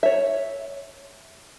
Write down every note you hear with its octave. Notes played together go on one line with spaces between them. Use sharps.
C#5 E5